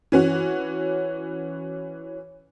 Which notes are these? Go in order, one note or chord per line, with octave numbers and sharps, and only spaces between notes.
E3 C#4 F#4